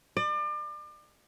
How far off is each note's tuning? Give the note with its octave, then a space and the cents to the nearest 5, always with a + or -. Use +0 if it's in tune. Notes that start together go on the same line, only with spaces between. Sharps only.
D5 +35